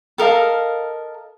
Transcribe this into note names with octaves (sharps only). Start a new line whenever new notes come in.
A4 A#4 D#5 F5